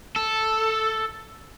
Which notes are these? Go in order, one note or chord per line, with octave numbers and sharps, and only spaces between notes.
A4